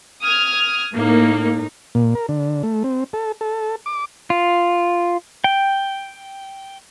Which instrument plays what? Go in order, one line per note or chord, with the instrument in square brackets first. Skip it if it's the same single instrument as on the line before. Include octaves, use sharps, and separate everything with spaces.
[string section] D#6 F6 G#6
[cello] A2 D#4 [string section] A#3
[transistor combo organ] A#2
A#4
D3
A3
C4
A4
A4
D6
[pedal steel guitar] F4
G5